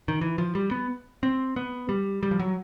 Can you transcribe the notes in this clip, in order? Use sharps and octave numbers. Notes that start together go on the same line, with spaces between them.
D#3
E3
F3
G3
B3
C4
B3
G3
G3
F3
F#3